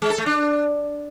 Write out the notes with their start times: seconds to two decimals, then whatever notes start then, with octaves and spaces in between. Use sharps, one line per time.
0.02 G#3
0.10 A4
0.18 A3
0.26 D4